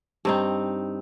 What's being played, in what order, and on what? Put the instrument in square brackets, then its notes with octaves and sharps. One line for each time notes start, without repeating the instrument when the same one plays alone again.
[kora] G2 C4 D#4